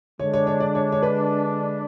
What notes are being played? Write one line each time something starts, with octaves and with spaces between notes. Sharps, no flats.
D3 G#3 D4 C#5
C#5
C#5
D5
C#5
C#5
B4